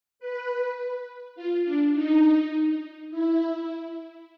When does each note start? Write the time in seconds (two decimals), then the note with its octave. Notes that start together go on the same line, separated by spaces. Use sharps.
0.20 B4
1.36 F4
1.65 D4
1.94 D#4
3.11 E4